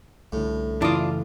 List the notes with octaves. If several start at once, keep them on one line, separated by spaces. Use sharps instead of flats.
C2 A2 D3
F#2 C#3 E3 D4 E4 F4 D6 D#6